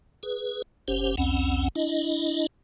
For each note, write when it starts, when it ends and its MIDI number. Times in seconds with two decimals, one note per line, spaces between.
0.23 0.62 68
0.23 0.62 71
0.88 1.15 30
0.88 1.15 61
0.88 1.15 67
0.88 1.15 72
1.17 1.68 35
1.17 1.68 40
1.17 1.68 60
1.17 1.68 61
1.17 1.68 78
1.75 2.47 62
1.75 2.47 64
1.75 2.47 75